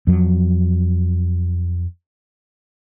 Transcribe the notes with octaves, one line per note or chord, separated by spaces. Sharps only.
F2 F#3